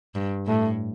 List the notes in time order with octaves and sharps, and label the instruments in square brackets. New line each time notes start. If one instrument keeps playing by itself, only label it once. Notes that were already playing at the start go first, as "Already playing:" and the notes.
[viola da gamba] G2
[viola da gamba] A2 [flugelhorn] A3